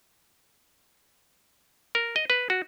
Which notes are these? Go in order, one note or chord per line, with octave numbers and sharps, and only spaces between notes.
A#4
D#5
B4
F#4